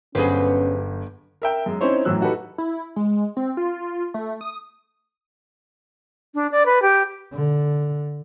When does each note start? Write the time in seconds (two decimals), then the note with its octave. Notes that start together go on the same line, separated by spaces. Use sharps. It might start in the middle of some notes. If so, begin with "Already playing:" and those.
0.15 G1 F#3 B3 C#4 G4 G#4 B4 C5
1.42 A#4 E5 G5
1.66 F#2 G#3
1.81 C4 C#4 D#4 E4 C5 C#5
2.05 F#2 A2 E3 F#3 E6 F#6
2.21 D#4 F#4 G4 A4 B4
2.58 E4
2.96 G#3
3.37 C4
3.57 F4
4.14 A3
4.41 D#6
6.34 D4
6.52 D5
6.66 B4
6.82 G4
7.33 D3